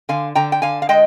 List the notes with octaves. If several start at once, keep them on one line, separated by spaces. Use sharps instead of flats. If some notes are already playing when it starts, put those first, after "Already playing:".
D3 F5 G#5
D3 G5 A#5
G5
D3 F5 G#5
F5
G#3 D#5 G5